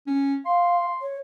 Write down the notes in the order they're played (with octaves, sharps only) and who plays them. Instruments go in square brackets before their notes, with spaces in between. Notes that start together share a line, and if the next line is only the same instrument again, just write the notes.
[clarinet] C#4
[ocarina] F5 [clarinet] C6
[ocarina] C#5